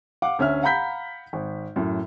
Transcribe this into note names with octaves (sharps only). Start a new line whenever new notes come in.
F5 F#5 D6
D2 C#4 E5 F6
F5 F#5 A#5 B5 G6 B6
G#1
F#2 A2